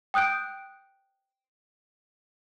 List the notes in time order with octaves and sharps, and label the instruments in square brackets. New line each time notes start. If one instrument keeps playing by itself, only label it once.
[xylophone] G5 D#6 F#6 G6 D7